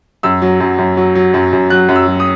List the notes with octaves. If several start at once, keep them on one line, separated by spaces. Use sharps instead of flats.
F#2 E6
F#3
F#2
F#2
F#3
F#3
F#2
F#2
F#3 F#6
F#2
E6
F#3
D#6